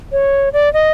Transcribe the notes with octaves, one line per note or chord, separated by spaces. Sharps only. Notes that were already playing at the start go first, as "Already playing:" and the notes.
C#5
D5
D#5